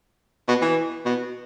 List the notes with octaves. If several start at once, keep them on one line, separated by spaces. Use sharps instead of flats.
B2
E3
B2